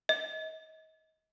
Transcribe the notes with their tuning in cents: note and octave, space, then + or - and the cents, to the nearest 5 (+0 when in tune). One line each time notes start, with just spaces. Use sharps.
D#5 +30